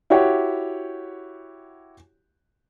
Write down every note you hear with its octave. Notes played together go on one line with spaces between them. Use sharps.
E4 F#4 G4 C#5 F#5 G5